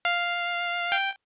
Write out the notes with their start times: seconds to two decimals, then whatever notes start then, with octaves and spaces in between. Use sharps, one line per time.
0.05 F5
0.92 G5